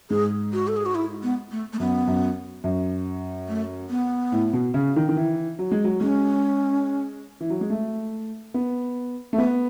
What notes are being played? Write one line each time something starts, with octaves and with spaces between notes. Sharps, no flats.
G#2 G#4
F#4
A4
G#4
F#4
E4
B3
A3
A3
F#2 B3
F#2
F#2
A3
B3
A2
B2
C#3
D#3
D#3
E3
F#3
G#3
F#3
G#3 C#4
E3
F#3
G#3
A3
B3
A3
B3 B4